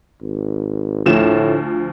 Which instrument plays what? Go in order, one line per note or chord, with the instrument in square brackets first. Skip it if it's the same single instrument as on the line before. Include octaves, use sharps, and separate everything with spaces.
[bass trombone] G#1
[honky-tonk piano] D2 F3 E7 [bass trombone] A2